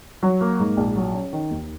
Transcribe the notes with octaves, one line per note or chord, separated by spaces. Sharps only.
F#3
A#3
G#2
A#1
F#3
C#4
D#3
D#2